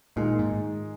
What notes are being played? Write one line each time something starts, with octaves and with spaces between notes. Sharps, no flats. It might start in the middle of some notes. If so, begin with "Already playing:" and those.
A#2 D#3 G#3 D#4
G#2